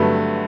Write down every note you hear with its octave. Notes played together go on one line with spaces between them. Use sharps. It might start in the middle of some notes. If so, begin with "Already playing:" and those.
Already playing: G2 D3 F#3 A3 B4